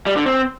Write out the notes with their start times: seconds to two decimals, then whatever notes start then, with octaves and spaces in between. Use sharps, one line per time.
0.06 G3
0.16 D3
0.26 C4